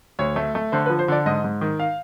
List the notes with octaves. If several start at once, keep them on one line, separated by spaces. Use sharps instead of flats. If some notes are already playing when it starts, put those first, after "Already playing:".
D2 C#5
A3
A3
D3 C5
B4
F3
C5
D3 D5
G#2 D#5
G#2
D#3
F5